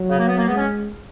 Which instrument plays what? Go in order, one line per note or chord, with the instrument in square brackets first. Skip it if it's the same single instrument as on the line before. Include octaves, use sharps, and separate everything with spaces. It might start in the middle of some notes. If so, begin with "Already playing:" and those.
Already playing: [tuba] F#3
[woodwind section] C#3
A#3
B3
A#3
[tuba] G#3 [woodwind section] B3
[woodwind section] C#4